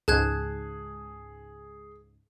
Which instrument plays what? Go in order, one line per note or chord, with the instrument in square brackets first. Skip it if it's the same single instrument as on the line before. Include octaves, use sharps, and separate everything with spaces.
[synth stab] C#2 G#2 [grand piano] G#4 [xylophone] A5 F#6 G#6